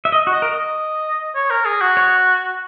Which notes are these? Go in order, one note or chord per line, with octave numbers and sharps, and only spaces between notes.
E5
D#5
F#4
D#5
A#4
D#5
C#5
A#4
G#4
F#4
C#5